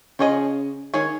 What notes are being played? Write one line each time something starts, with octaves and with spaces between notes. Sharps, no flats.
C#3 F3 C#4 G#4 D#5
D#3 C#4 G#4 C#5